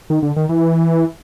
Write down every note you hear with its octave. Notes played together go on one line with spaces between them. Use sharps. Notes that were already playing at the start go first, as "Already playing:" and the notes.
D#3
D3
D#3
E3